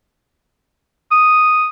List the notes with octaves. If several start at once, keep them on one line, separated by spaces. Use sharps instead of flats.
D#6